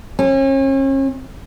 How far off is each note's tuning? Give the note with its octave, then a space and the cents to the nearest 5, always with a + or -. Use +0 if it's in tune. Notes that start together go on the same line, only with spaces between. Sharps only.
C#4 -40